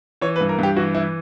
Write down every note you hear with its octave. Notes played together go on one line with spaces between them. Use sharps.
E3 C#5
B4
G2
A#4
G2 G4
E3 F#4
E3 E4